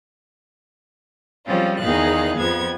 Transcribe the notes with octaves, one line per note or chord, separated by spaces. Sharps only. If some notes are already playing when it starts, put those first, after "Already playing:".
F3 G3 G#3 C4 C#4 F4
E2 D#3 D#4 G#4 F5 F#6
F2 F3 B3 G#6